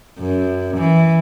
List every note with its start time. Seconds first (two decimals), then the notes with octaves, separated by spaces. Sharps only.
0.19 F#2
0.77 E3